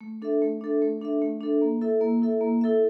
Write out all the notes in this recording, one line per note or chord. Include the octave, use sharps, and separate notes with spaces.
A3
D4 A4 E5
A3
D4 A4 E5
A3
D4 A4 E5
A3
D4 A4 E5
A#3
E4 A4 E5
A#3
E4 A4 E5
A#3
E4 A4 E5